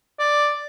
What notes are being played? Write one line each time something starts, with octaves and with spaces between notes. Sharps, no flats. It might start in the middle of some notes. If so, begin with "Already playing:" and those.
D5